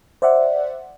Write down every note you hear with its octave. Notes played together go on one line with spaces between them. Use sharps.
C5 D5 E5 F#5